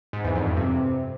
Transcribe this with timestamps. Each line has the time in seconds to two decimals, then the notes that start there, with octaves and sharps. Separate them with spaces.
0.13 G#2
0.24 E2
0.35 F2
0.46 G2
0.57 C3